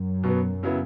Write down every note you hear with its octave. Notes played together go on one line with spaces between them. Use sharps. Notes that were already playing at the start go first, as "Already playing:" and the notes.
Already playing: F#2
B2 F#3 B3
C#3 F#3 B3 E4